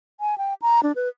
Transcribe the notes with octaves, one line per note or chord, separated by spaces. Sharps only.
G#5
G5
A#5
D4
B4